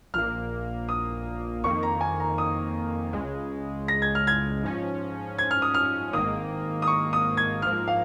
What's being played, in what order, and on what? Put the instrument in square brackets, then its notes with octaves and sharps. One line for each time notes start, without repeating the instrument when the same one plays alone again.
[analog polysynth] A#1 A#2 A#3 [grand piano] F6
[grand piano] D#6
[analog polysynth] F2 D#3 A#3 [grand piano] C#6
[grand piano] A#5
G#5
A#5
D#6
[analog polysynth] C#2 C#3 G#3
[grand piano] A#6
G#6
F6
G#6
[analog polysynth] G#2 F3 C#4
[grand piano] G#6
F6
D#6
F6
[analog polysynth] G#1 G#2 D#3 A#3 [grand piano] D#6
[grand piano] D#6
C#6
D#6
G#6
[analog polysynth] G#2 F3 A#3 [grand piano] F6
[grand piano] F5